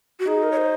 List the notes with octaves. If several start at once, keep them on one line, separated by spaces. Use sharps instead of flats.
F#4
D#4 G#4
A#4
C#5
C5